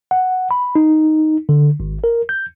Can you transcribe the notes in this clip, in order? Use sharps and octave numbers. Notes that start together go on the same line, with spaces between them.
F#5
B5
D#4
D3
G#1
A#4
G6